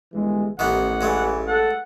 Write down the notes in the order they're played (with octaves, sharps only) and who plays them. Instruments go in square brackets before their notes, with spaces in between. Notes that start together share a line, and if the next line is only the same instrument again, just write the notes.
[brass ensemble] G1 E3 G#3
[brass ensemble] A1 [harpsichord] D#3 E3 B3 [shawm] F#5
[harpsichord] G2 G#3 A3 [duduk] E3
[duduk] A4 [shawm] F#5